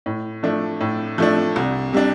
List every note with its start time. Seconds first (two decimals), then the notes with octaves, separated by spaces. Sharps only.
0.06 A2
0.43 F3 A3 D4
0.81 A2
1.18 F3 A3 D4
1.56 C2
1.93 C3 G3 D4